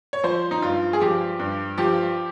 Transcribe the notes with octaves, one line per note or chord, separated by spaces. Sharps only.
C#5
F3 C5
D#4
G2 F4
G#4
F3 G4
G2
F3 G4